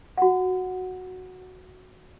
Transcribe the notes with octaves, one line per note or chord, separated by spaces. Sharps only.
F#4 F#5